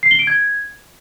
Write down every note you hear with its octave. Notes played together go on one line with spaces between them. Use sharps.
C7
G7
D7
G#6